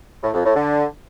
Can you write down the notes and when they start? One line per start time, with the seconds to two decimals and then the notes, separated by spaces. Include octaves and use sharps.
0.23 A2
0.33 F2
0.44 A2
0.55 D3